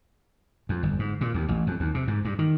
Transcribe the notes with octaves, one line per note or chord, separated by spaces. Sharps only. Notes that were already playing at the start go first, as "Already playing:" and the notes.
F2
G1
G#2
A#2
D#2
A1
F2
D#2
C3
G#2
G2
D#3